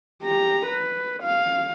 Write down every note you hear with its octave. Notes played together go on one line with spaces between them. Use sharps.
G4 A#5
B4
F5